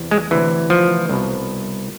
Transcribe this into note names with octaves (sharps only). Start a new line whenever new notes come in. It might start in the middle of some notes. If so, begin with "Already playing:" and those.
Already playing: E2 C3 E3
G#3
D2 C3 E3
F3
C2 B2